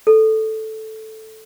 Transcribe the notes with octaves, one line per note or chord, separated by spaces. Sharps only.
A4